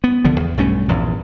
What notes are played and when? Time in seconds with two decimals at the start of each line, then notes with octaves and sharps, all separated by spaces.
0.04 B3
0.24 C2 D3 F3 B3
0.40 E2
0.57 B1 G2 A3 C#4
0.88 A#1 E2 G2